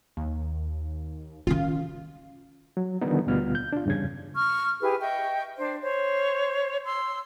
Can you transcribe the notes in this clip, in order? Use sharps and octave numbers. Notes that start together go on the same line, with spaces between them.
D#2
D#3 C#4 F4
F#3
D3 D#3 F3 G3 B3 D#4
D2 B2 G3 B3 F4 F6
G6
D4 F4
E2 G2 C#3 C#4 G#6
C#6 F6
E4 G4 G#4 B4
D#5 E5 G5 C#6
D4 C5
C5 C#5
C6 E6